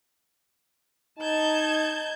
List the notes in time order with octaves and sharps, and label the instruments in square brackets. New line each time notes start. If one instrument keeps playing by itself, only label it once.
[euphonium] D#4 [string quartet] A5 G6 G#6